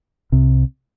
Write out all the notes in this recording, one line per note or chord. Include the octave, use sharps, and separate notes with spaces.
C2 C3